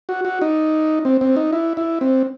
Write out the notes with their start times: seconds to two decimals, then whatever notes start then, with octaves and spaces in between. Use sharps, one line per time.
0.09 F#4
0.25 F#4
0.41 D#4
1.05 C4
1.21 C4
1.36 D#4
1.53 E4
1.77 E4
2.01 C4